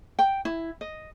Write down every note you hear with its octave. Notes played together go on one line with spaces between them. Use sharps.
G5
E4
D#5